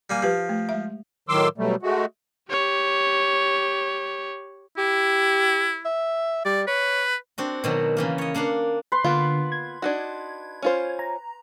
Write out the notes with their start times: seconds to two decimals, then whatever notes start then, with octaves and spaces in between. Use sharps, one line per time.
0.10 G3 A#3 G#5
0.22 F3 G4 B4
0.49 A3
0.69 G#3 E5
1.29 A2 D#3 F#3 C6 D6 E6
1.58 B2 F#3 G3 A3
1.82 G#3 A3 F#4
2.50 G4 C#5
4.78 E4 G4
5.85 E5
6.45 G3 D5
6.67 B4 C#5
7.38 C4 D4 F#4
7.64 B2 D#3 F#3
7.97 C#3 E3 A#3
8.18 C#5 D#5
8.34 A#3 D4 F5 F#5
8.92 B4 C6
9.04 D3 A#3 B3 F4
9.52 G#6
9.82 D4 D#4 F#4
10.62 C#4 F4 C5
10.99 A#5